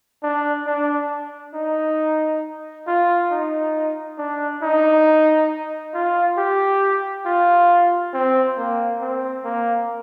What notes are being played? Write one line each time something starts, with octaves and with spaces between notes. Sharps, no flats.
D4
D4
D#4
F4
D#4
D4
D#4
F4
G4
F4
C4
A#3
C4
A#3